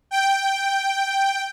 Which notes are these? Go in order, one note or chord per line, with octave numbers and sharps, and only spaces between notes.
G5